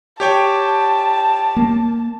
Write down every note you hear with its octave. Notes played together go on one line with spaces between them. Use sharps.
G4 C#5 G5 A5
A#3